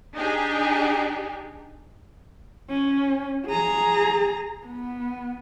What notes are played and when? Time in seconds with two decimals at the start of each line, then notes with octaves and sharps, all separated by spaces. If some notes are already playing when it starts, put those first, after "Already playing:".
0.15 D4 D#4 G4 G#4
2.70 C#4
3.46 G#4 A#5
4.66 B3